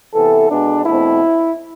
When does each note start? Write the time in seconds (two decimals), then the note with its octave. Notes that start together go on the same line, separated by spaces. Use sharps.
0.13 C3 E3 B3 A4
0.49 B2 G#3 B3 D4
0.85 E2 B2 A3 C4 E4